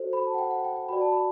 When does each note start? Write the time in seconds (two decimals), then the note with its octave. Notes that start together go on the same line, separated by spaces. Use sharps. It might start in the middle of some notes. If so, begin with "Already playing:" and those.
Already playing: F#4 A4 C5
0.13 B5
0.26 A5
0.34 F#5
0.38 G5
0.51 F#5
0.64 G5
0.76 G5
0.89 F#4 B4 D5 B5
1.01 A5
1.12 B5